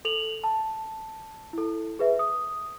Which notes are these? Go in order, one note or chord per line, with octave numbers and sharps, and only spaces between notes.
A4 F7 F#7
A5
E4 A4
G#4 B4 E5
D#6